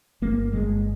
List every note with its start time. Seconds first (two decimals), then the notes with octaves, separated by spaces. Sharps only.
0.22 G1 A#3
0.53 G1 G#3